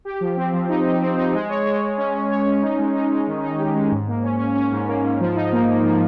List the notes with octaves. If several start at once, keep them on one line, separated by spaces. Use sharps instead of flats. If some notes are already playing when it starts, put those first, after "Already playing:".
G4
F3
C4
F3
D#4
D#4
C4
D#4
G#3
C#5
G#3
G#3
C#4
C#4
C#5
C#4
D#4
G#3
D#4
G#3
D#3
D#4
G4
G#3
G#2
A#3
C#4
C#4
C#4
G#2
A#3
G#2
F3
D#4
A#3
A#3
F3